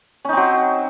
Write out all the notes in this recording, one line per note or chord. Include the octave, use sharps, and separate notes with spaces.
F#3 C4 C#4 D#4